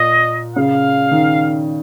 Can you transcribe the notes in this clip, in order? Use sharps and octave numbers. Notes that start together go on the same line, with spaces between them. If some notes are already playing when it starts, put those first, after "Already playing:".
Already playing: A#2 D#5
C#3 F5
D#3